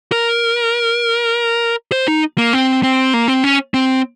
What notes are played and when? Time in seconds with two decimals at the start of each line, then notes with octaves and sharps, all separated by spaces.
0.12 A#4
1.92 C5
2.08 D#4
2.38 A#3
2.53 C4
2.83 C4
3.14 A#3
3.28 C4
3.44 C#4
3.74 C4